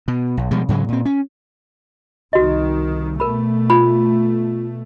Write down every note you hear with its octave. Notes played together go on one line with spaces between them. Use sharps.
B2
B1
B2 F3 G3 G#3
G#2 C#3 F#3 G#3
A#2 C4
C#4
C2 D#3 F#4 D#5
B2 A3 A#4 B5
F4 B5